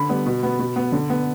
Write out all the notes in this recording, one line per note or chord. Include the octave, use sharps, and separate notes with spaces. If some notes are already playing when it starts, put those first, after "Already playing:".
Already playing: D3 B5
G3 B3
B2
B3
B2
B3
D3
B3